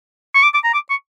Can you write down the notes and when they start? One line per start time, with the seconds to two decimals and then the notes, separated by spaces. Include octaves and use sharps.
0.35 C#6
0.43 D6
0.54 D6
0.64 A#5
0.74 D6
0.90 C#6